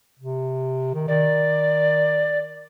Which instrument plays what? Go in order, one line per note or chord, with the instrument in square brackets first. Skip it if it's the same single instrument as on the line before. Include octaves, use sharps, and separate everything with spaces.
[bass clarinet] C3
D#3
[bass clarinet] D#3 [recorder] D5